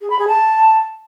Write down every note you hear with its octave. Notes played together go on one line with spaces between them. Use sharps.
G#4
B5
G#4
A5